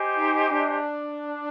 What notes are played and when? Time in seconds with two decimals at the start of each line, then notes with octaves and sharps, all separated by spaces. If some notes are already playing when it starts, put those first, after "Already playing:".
Already playing: G4 C5 D#5 G#5
0.18 D#4
0.52 D4